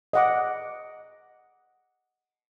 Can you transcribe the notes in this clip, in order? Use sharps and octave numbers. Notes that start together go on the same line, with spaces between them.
D#5 F#5 D6